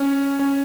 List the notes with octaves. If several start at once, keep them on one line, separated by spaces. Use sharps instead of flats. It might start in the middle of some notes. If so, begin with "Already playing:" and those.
Already playing: C#4
C#4